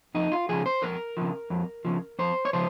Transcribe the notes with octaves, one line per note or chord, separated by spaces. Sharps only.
F2 D#4
F4
C#3 F3 G#4
C5
F2 A#4
C#3 F3
F2
C#3 F3
F2 C5
C#5
C#3 F3 C5